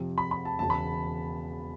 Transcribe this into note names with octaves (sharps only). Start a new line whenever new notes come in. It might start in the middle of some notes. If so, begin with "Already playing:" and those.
Already playing: F2 C3 F3
B5
B5
A5
E1 E2 C#3 A5
B5